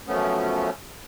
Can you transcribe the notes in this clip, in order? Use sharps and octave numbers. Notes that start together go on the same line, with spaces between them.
F#2 F3 A3 B3 C#4